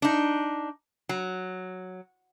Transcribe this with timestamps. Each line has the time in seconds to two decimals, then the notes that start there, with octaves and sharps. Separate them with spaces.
0.02 D4 D#4
1.09 F#3